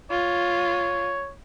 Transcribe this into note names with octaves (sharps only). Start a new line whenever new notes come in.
F4 C#5